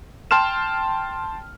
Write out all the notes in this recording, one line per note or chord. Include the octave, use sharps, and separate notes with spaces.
G5 A5 C6 F6 E7